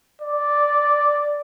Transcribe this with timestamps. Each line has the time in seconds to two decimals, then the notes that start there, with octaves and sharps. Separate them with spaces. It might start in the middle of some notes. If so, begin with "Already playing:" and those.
0.21 D5